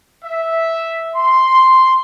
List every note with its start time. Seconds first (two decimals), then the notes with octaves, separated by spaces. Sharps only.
0.24 E5
1.16 C6